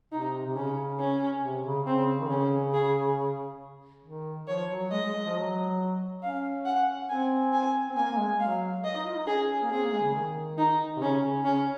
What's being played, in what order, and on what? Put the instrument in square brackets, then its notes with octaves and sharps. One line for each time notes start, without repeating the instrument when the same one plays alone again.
[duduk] C3 [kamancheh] D#4
[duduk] C3
[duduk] C#3 [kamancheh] C#4
[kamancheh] C#4
[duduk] C3
C#3
[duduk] C#3 [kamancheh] C4
[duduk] D#3
[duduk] C#3 [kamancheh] C#4
[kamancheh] G#4
[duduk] D#3
[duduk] F3 [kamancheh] C#5
[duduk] F#3
[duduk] G#3 [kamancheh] D#5
[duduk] G#3
G#3
F3
F#3
[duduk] C#4 [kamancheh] F5
[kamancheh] F#5
[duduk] C4 [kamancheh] G#5
[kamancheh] G#5
[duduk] C4
[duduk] A#3 [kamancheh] G#5
[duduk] A#3
G#3
[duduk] F#3 [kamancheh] F5
[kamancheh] D#5
[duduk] D#4
F4
D#4
[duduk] C#4 [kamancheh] G#4
[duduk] A#3
[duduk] C4 [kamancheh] G#4
[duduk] A#3
G#3
C#3
D#3
[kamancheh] D#4
[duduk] C3
[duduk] C#3 [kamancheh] C#4
[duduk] C#3
[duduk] C#3 [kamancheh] C#4